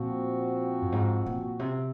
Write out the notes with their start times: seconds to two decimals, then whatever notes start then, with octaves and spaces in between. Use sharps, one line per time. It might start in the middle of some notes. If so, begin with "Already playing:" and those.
Already playing: A#2 F3 C4 F#4
0.82 F#2
0.92 G#2
1.26 A#2
1.59 C3